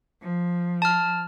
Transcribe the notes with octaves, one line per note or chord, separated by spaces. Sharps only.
F3
A5 F6